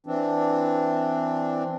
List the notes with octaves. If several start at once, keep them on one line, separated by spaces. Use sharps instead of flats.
E3 C4 D4